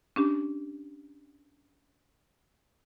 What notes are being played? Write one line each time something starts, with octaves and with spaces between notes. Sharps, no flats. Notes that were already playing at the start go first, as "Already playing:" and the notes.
C#4 D4 G4